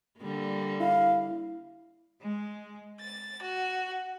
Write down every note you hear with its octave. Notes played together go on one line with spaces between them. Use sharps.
D3 G3 A#3
E4 F5
G#3
A6
F#4